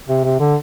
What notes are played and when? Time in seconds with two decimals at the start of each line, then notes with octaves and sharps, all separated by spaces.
0.09 C3
0.24 C3
0.40 D3